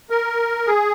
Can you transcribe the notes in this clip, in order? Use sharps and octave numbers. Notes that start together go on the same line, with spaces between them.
A#4
G#4